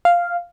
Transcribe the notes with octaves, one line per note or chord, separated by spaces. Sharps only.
F5